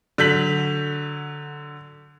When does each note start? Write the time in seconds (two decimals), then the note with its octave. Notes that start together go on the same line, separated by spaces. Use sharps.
0.18 D3 F#3 G6 B6 F#7